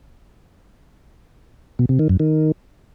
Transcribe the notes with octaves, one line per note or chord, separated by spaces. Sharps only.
B2
C3
D#3
F#2
D#3